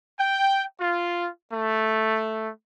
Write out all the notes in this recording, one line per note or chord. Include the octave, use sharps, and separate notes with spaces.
G5
F4
A3